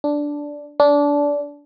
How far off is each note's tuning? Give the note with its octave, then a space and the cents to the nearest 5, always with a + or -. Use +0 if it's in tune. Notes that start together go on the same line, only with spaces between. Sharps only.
D4 -5
D4 -20